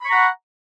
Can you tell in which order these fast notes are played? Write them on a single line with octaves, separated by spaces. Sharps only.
B5 C#6 A#5 F#5